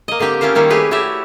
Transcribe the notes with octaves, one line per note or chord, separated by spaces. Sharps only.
A#3 D#5
D3 A#3 C4 G4 G5
C#4 E4 F4 A#4 C5
D#3 G3 A#3 E4
A3 G4 G#4 B4 C#5
E4 F#4 G4 C#5 D5 E5